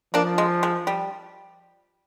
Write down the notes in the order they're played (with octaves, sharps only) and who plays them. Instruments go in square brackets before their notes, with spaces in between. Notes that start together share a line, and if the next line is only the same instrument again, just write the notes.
[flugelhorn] F3 [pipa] A#3 D4
[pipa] G#3
G#3
G3